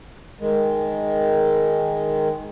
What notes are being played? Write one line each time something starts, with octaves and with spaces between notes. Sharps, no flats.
D#3 G#3